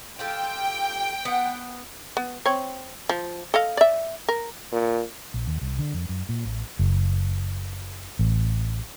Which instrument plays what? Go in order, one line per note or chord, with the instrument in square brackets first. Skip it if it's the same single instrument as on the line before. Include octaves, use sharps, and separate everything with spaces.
[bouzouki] F4 G4 A4 [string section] G5
[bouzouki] B3 F#5
[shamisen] B3
C4 C#5
F3
A4 D#5 F5
D5 E5
A#4
[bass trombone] A#2
[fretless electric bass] A#1
D#2
C2
D3
F2
F#2
A#2
A1
[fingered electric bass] F#1
A1